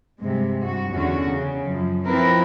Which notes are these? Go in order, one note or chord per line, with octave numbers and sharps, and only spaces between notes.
G2 C3 G#3
G2 F#4
E2 D3 C#4 F#4
C#3
F#2 F3
F3 C4 E4 A#4 B4